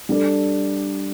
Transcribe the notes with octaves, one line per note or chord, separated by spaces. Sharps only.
G3 D4 A4